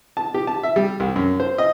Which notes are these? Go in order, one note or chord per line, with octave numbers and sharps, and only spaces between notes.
A5
G4
A5
E5
G3
C2
F#2
C5
D#5